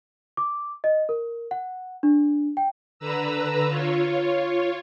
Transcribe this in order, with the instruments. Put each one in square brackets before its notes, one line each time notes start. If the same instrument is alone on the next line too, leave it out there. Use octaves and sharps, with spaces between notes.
[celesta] D6
D#5
A#4
F#5
D4
G5
[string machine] D3 B4 A#5 E6
F4 C#5